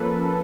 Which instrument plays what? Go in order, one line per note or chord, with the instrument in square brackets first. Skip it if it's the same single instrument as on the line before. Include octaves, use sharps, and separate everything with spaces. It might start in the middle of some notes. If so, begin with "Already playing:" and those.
Already playing: [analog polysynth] F3 A#3 C#4 A4 B4